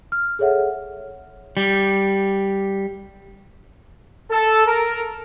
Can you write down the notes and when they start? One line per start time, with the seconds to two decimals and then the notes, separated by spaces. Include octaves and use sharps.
0.12 F6
0.39 G#4 A4 C#5 E5 F#5
1.57 G3
4.31 A4
4.66 A#4